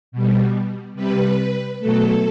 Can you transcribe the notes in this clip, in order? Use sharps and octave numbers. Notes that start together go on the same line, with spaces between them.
B2 G3
C3 G3 B4
B2 F#3 A3 A4